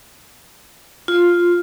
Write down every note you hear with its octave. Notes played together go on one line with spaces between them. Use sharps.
F4